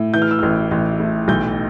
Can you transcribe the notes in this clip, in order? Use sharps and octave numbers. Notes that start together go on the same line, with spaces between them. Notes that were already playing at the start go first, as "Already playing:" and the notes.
Already playing: A2
E3 G6
F6
E6
A1 F6
A1
A2
B1 G6